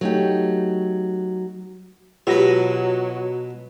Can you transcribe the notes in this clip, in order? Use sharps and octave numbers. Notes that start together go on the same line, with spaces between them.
F#3 A3 D#4 G4
B2 F#3 F4 G4 B4 A#6